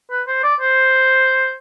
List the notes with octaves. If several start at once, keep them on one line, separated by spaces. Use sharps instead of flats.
B4
C5
D5
C5